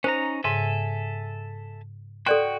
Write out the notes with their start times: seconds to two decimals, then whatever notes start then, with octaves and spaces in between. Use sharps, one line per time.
0.04 C#4 D#4 C5 A#5
0.44 G#2 C#3 A4 E5 G#5
2.26 F#4 A4 D5 G5 C6 F#6